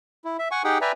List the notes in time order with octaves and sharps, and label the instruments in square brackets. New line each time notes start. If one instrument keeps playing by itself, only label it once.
[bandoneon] E4
E5
F#5 G#5 C#6
D#4 G4 G#4 F#5 G5
B4 D5 E5 G5 G#5 A#5